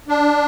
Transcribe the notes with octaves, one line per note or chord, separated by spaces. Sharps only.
D4